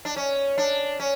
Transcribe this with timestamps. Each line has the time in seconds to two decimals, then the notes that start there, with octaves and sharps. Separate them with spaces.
0.05 D4
0.16 C#4
0.58 D4
1.00 C#4